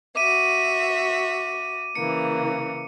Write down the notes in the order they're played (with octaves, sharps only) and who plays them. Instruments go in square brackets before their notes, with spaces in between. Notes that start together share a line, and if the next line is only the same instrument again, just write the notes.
[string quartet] F#4 E5 [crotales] D6 D#7
[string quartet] C#3 E3 A#3 [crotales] C#7